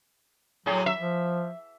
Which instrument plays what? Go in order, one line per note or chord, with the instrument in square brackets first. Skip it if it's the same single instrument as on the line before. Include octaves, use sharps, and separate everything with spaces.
[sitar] A2 G#4 [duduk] F#3
[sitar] E5
[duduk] F3